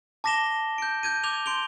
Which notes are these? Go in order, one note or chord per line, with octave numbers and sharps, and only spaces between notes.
A5 D6 A#6 B6 E7 G7
G6 D7
G6 G#6 D#7
D6 G6 G#6 F7 G7
C6 D7 F7 G7